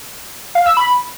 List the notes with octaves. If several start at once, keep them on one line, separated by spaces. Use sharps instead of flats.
F5
E6
B5